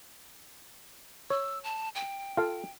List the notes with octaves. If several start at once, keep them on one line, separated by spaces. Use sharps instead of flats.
C#5 E6
A5
G5
F4 A4 F5